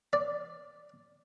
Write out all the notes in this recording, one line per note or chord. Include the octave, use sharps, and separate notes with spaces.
D5